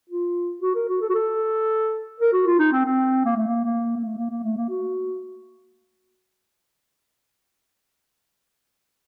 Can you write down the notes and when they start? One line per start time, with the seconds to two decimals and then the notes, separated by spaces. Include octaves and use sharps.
0.09 F4
0.62 F#4
0.75 A#4
0.89 F#4
1.01 A4
1.10 F#4
1.14 A4
2.20 A#4
2.33 F#4
2.46 F4
2.59 D#4
2.72 C4
2.85 C4
3.25 A#3
3.36 A3
3.47 A#3
3.64 A#3
3.97 A#3
4.04 A3
4.18 A#3
4.30 A#3
4.43 A3
4.57 A#3
4.69 F#4